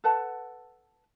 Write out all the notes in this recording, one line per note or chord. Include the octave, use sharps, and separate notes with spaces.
A4 B4 F#5 A5